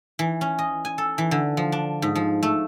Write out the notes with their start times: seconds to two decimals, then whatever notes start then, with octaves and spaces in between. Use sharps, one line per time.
0.19 E3
0.41 C#4
0.59 D#5
0.85 G#5
0.98 A4
1.18 E3
1.31 D3
1.57 F3
1.72 D4
2.02 G#2
2.15 F3
2.43 A3